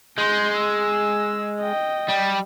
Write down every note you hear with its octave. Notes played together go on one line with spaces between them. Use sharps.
G#3 C6 G6
E6
D#5 G5
G3